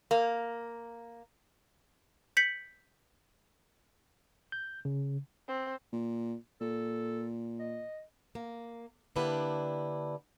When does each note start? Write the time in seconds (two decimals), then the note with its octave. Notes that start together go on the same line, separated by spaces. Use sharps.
0.11 A#3
2.37 G6 B6 C#7 F#7
4.52 G6
4.85 C#3
5.48 C4
5.93 A#2
6.61 A#2 A4
7.59 D#5
8.35 A#3
9.16 D3 A#3 D4 E4 G4 B4